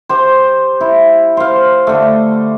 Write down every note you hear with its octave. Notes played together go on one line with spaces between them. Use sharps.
G4 C5
E4
C5 F5
D3 A3